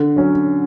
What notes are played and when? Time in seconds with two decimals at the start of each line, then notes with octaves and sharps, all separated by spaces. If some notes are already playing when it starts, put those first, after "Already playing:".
Already playing: D3
0.16 F#3 C#4